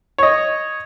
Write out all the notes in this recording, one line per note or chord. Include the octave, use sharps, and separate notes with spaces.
C#5 D#5